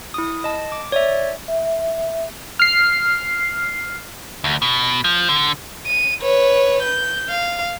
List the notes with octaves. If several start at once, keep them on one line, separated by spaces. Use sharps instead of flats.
E4 D#6
D#5 A5
D6
C#5 D5 E5
E5
F6 C7
D2
B2
F3
D3
D#7
B4 C#5
G6
F5